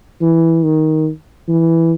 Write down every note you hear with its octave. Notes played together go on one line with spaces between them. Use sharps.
E3
D#3
E3